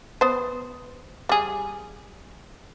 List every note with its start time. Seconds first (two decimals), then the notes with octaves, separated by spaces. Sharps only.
0.21 B3 C5
1.29 G3 G#4